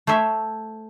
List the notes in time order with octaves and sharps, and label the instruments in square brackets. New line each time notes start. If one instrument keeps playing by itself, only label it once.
[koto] A3 C5 C#5 E5